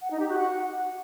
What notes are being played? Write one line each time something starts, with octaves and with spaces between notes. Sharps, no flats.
F#5
D#4
G4
F#4
F#5